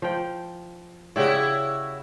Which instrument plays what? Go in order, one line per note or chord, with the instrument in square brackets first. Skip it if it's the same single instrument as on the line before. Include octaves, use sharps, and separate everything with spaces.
[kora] F3 G5
[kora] C#3 G4 D5 [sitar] E4 F#4 C#5